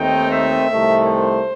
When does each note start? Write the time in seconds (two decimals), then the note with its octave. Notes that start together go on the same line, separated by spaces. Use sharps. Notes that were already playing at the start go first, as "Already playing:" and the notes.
Already playing: D#2 D#3 A3 C4 D#4 G5
0.31 E5
0.69 C2 C3 D#3 A3
1.07 C5